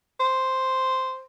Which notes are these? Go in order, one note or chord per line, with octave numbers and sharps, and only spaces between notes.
C5